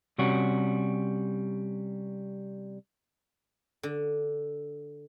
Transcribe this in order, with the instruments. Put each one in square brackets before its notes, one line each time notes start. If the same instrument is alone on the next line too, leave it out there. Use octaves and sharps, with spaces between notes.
[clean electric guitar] C3 G3 C#4 F#4
[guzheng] D3